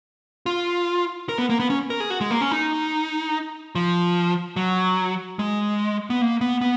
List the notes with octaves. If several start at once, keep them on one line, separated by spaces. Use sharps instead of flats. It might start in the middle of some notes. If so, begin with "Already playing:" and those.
F4
A#4
B3
A#3
B3
C#4
A#4
G#4
F#4
G#3
A#3
C#4
D#4
F3
F#3
G#3
B3
A#3
B3
B3